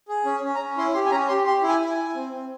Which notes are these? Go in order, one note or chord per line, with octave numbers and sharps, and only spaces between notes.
G#4
C#4
C#4
A#5
C#4
E4 C6
G4 C6
G#5
C#4 A#5
G4 C6
G4 C6
E4
G#5
E4
G#5
E4
C4
C4